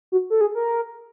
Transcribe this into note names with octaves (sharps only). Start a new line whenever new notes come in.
F#4
A4
G#4
A#4